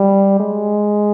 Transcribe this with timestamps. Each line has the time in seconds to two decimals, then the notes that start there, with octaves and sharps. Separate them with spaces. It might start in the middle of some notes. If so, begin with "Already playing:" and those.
Already playing: G3
0.40 G#3